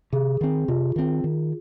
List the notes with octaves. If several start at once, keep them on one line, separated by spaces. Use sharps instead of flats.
C3 G#4
D#3 C4
C3 F4
D#3 C4
D#3